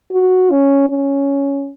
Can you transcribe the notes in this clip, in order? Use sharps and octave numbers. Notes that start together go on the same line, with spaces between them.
F#4
C#4
C#4